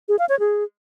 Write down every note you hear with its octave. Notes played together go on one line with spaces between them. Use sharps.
G#4
F5
C#5
G#4